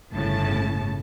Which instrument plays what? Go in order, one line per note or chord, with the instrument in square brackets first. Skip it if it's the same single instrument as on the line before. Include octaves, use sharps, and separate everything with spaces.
[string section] G1 A2 C#3 A5